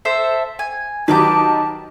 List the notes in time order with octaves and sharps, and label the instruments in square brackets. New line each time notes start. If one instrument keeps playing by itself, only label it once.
[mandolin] A4 C5 E5
G#5
[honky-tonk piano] D#3 F#3 G4 [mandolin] B4 D#5 D6 [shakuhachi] A5